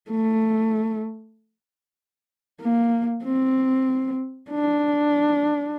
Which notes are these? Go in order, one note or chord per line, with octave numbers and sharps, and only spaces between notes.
A3
A#3
C4
D4